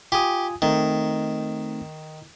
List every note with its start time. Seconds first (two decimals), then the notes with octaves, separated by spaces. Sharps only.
0.12 F4 G4 G#5 D#6
0.62 D#3 A3 C4 D#4